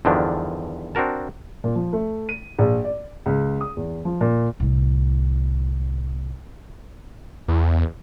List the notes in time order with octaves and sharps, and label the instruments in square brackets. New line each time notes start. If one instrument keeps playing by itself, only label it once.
[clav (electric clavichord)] E2 G2 D3 D#3 F3 D4
C4 D4 F#4 A#4 A5
[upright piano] A#2
F3
A3
D#7
A#1
D5
C#2
D#6
E2
F3
A#2
[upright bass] C2 A2
[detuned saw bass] E2